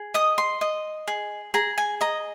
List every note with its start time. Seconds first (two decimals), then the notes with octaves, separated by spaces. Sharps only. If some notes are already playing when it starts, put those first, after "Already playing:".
Already playing: G#4
0.14 D#5 D#6
0.38 C6
0.61 D#5
1.07 G#4
1.54 G#4 A#5
1.78 G#5
2.01 D#5 A#5